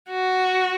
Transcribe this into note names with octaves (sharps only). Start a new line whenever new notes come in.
F#4